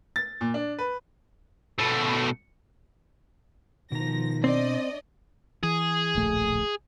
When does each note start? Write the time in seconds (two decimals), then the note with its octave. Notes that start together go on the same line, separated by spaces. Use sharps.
0.16 A6
0.41 A#2
0.54 D4
0.78 B4
1.79 B2 A3
3.92 B2 D#3 F3 A#5 A#6
4.44 C4 D4 D5 D#5
5.63 E3 G#4
6.15 D1 A#1 A3